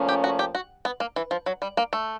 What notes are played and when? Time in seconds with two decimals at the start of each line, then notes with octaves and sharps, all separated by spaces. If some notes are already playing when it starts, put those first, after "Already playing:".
Already playing: A#2 F3 A3 C#4
0.09 G4
0.24 F#4
0.39 G4
0.55 F#4
0.85 B3
1.00 A#3
1.16 E3
1.31 F3
1.46 F#3
1.62 G3
1.77 A#3
1.93 A3